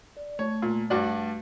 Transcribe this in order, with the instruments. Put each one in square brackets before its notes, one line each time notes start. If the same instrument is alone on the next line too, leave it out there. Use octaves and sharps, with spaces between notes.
[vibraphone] D5
[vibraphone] A3 [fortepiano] C#5
[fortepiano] A#2
G2 F#4 D5